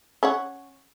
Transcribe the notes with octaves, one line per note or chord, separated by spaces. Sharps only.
C#4 C#5 F#5